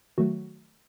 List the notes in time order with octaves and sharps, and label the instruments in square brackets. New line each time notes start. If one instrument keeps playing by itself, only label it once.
[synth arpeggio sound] D#3 F#3 A3 F#4